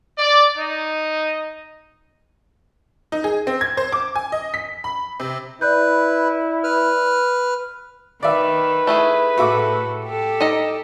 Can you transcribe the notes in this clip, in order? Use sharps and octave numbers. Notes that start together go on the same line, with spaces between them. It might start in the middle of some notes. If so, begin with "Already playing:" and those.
D5
D#4 D#5
D#4
G#4
C4
G#6
C5
D6
G#5
D#5
B6
B5
C3
E4 B4 D5 F#6 G6
B4 F6
D#3 B4 D5 E5
A3 E4 G#4
A2 F#4 A4 E5 D6
G4 A4
D#4 D#5